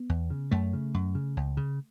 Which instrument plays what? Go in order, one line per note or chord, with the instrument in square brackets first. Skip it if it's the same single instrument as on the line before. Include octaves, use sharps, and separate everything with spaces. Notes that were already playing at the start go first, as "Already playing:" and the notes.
Already playing: [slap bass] B3
E2
C#3
F#2 A3
C#3
F#2
C#3
C#2
C#3